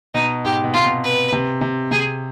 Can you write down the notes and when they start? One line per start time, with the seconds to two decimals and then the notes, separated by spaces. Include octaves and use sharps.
0.14 B2 D#4
0.45 G#2 G4
0.64 B2
0.74 C3 F4
0.85 B2
1.03 B4
1.32 C3
1.61 C3
1.91 C3 G#4